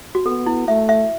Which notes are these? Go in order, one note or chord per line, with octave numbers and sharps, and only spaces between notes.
F#4
B3 A4
E4
A3 E5
E5